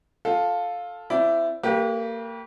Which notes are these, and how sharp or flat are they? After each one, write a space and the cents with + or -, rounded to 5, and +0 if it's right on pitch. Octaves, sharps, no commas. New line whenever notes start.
F4 +10 A4 +0
C4 -20 E4 +15 D5 -15
A#3 -30 G4 +0 B4 -40